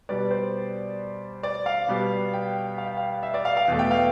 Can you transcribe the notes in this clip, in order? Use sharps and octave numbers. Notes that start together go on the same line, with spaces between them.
B2 G3 B3 D5
C5
D5
F5
B2 G3 B3
G5
F5
G5
F5
E5
D5
F5
F5
E2 B2 A3
G5
F5